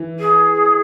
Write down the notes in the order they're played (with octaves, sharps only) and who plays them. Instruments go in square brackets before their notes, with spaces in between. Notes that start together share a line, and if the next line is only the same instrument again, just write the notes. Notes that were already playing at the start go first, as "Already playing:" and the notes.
Already playing: [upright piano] E3
[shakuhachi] G#4